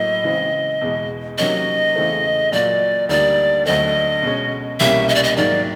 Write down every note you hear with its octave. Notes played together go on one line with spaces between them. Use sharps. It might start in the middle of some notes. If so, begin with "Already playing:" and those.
Already playing: A2 F#3 A#3 D#5
C#3 E3 G#3 C4
E2 B2 G#3
C3 D#3 F#3 A#3 C#4 D#5
E2 C#3 E3 A3 C4
A#2 F#3 A#3 D5
D2 D3 G3 A#3 D#4 D5
D2 D3 F#3 A3 C4 D#5
B2 G#3 C#4
C2 B2 G3 A#3 C#4 E5
D#5
D5
D#5
G#2 D#3 F#3 A#3 D5